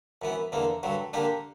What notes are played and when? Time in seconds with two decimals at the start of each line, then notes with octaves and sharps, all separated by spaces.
0.22 F#2 E3 B3
0.52 E2 D3 A#3
0.83 G2 D3 F#3
1.13 D3 A#3 D4 G4